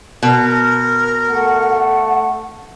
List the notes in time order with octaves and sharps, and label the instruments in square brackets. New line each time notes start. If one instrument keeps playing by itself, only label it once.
[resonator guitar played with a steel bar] B2 [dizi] A#4
[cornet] A3 [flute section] F#5